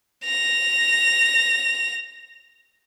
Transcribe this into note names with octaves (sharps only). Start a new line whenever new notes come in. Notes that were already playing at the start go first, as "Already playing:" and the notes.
A#6 F7